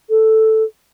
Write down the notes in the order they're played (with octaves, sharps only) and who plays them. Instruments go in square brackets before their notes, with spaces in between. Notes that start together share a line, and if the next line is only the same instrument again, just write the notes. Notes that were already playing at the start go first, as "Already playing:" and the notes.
[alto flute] A4